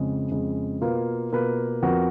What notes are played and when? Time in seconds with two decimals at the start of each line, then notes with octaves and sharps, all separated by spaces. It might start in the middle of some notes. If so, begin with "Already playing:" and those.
Already playing: F2 C#3 G#3
0.31 F2 C#3 G#3
0.81 B2 A#3 F4 B4
1.32 B2 A#3 F4 B4
1.82 F2 F3 B3 F#4 A#4